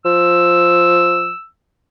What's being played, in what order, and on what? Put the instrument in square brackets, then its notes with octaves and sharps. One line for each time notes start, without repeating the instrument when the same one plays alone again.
[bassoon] F3 [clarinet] E6